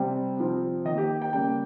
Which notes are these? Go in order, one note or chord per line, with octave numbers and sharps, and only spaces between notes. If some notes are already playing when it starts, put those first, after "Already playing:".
Already playing: C3 G3 C4
C3 F3 C4
D#3 A#3 D#5
G4
G5
C#3 G3 A#3 G5